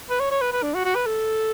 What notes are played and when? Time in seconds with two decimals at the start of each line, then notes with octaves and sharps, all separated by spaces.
0.10 B4
0.19 C#5
0.31 C#5
0.41 B4
0.53 B4
0.63 D4
0.74 F#4
0.85 F#4
0.95 B4
1.06 A4